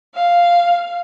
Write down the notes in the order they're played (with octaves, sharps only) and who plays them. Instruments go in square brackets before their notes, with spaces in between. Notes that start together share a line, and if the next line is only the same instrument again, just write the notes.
[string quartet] F5